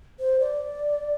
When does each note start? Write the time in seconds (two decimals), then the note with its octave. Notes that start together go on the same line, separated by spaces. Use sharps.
0.19 C5
0.40 D5